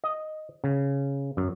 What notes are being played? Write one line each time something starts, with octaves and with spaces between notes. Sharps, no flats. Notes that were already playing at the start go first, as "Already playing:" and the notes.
D#5
C#3
F#2